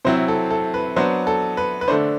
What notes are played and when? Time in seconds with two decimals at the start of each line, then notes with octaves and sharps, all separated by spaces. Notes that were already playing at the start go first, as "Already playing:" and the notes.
0.05 C3 F#3 C4 E4 C5
0.28 A4
0.51 A4
0.74 B4
0.96 F#3 B3 D4 C5
1.27 A4
1.57 B4
1.81 B4
1.88 D3 A3 D4 C5